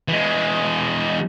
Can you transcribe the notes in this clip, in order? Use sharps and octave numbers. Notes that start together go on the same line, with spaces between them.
E3 G#3